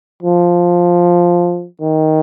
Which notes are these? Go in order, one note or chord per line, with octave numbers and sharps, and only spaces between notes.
F3
D#3